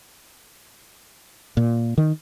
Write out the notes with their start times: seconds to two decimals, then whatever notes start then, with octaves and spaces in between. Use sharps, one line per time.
1.57 A#2
1.98 D#3